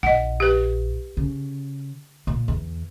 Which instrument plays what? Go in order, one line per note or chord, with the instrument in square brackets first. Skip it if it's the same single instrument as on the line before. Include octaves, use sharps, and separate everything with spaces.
[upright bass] A#1 [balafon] D#5 F#5
[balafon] G4 B4
[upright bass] C#3
A#2
E2